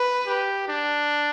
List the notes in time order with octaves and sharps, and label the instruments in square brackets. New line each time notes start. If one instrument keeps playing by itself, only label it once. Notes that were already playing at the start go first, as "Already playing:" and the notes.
Already playing: [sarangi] B4
[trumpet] G4
D4